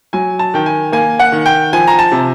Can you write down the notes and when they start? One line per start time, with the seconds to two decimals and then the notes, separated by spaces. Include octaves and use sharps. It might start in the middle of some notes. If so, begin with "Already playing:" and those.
0.13 F#3 G#5
0.39 A5
0.54 D#3 G5
0.66 G#5
0.92 A#3 G#5
1.19 F#5
1.32 D#3
1.46 G5
1.73 F3 G#5
1.87 A#5
1.99 A5
2.12 C3